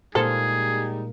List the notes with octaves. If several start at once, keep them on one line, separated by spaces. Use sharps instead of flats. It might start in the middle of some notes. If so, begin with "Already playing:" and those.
A#2 G3 G#3 D#4 G#4 A4 C5 F6